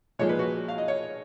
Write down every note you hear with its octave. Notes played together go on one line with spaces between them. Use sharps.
A#2 F3 G#3 C#5
B4
F#4
F5
D#5
C#5